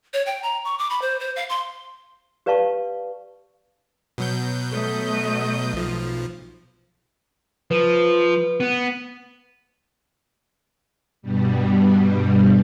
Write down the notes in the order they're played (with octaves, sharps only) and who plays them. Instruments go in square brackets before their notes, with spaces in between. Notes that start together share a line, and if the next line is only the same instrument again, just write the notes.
[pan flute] C#5
G5
A#5
C#6
D6
B5
C5
C5
F5
C6
[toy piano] G4 B4 D5 F5 A5 C#6
[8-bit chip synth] B2 F#3 G6
[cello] A3 D#5
[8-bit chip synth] B1 F3
[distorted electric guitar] F3 [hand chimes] B4
[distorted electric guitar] B3
[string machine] G2 B2 G3